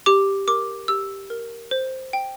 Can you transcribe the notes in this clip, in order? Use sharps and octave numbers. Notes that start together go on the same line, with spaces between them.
G4 D6
A#4 D6
G4 E6
A#4
C5
G5